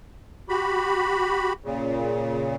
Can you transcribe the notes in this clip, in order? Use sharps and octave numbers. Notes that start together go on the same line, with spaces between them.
F#4 G4 B5
A#2 C#3